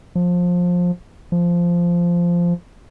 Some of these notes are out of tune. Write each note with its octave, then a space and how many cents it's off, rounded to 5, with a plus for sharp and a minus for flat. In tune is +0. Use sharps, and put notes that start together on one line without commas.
F3 +20
F3 -10